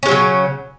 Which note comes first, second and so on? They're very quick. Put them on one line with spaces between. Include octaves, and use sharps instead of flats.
C#4 G#3 F#3 C#3